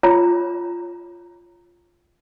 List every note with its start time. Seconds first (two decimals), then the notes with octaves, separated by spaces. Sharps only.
0.03 F4 C#5 A#5